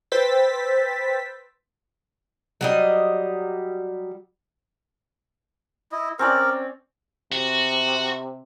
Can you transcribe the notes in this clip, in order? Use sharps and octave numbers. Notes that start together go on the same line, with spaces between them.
B4 C5 G5 E6 A6 B6
F#3 G3 D#5
E4 D#5
C4 C#4 A#4 D5
C3 F#4